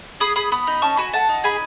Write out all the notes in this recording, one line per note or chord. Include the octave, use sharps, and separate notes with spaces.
G#4 B5 D#6
G#4 B5 D#6
B3 B5 D#6
D#4
C#4 A5 C#6
F#4 G#5 B5
A3 F#5 A5
D#4
G#4 G#5 B5